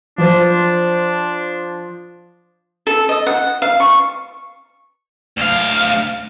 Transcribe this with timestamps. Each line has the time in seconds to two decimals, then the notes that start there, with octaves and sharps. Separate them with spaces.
0.18 F3 D4 C5
2.87 A4
3.09 D#5
3.27 F#5
3.62 F5
3.80 C#6
5.37 D2 F5